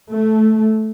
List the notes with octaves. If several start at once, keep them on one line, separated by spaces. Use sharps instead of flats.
A3